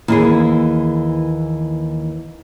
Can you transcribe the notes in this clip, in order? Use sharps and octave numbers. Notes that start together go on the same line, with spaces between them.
D#2 E3 G#4